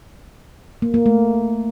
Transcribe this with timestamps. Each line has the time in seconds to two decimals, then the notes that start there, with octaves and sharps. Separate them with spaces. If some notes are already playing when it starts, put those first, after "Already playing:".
0.82 A#3
0.94 A#3
1.06 A3